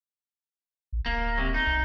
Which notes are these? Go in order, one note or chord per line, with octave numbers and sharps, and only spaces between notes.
A#1
D1 A#3
C3 F#3
D#4
C2